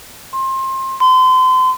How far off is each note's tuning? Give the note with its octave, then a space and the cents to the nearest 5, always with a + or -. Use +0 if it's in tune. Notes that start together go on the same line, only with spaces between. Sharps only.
C6 +25
C6 -35